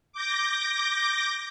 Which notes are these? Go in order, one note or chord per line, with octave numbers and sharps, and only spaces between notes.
D6 G6 A#6